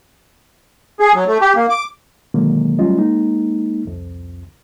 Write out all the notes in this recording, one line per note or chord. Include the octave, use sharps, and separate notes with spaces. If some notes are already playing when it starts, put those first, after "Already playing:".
G#4
F#3
A3
G4
A#3
D6
B2 D3 D#3 F#3 G#3 A#3
F#3 G3 A3 C#4 F4 D#5
G#3 A#3 D#4
C2 F2